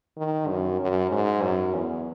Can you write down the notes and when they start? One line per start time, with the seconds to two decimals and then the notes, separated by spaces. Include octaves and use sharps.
0.18 D#3
0.48 F#2
0.80 F#2
1.11 G#2
1.43 F#2
1.74 E2